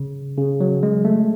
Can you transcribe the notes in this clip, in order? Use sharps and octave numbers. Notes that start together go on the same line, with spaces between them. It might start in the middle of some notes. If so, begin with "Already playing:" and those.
Already playing: C#3
C#3
F#3
G#3
A3